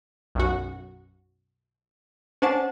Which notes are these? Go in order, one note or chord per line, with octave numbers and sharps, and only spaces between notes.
B1 F#2 F#4
C#4 D4 C5 F#5 A5